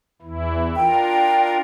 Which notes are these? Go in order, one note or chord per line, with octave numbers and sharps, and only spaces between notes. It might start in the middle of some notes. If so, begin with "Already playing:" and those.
E2 E3 E4
D4 F4 A#4 G5